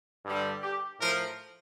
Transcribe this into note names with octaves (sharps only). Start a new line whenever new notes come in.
G2 D3 G3
G4
A2 F3 A#4